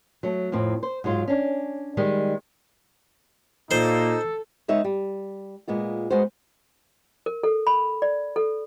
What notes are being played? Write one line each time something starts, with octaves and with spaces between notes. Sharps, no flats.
F#3 A3
F2 A2 C4
C5
G#2 F#3 G#3 F4
C#4 D4
D#3 G3 G#3
A#2 A#3 D#4 A4 C5 C6
G#3 B3 D#4 C#5 E5
G3
A#2 G#3 B3 F4
G#3 B3 F#4 C5
A#4
A4
B5
D5
A4